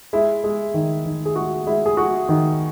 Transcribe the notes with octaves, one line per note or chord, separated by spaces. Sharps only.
G#3 E4
G#3
D#3
D#3
G#4
G#3 F#4
G#3 E4
G#4
G#3 F#4
D#3